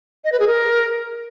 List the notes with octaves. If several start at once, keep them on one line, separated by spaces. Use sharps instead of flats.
D#5
B4
G#4
A#4